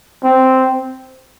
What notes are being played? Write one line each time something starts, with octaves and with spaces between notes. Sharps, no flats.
C4